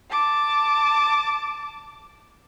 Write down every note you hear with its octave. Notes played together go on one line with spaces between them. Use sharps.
A5 D6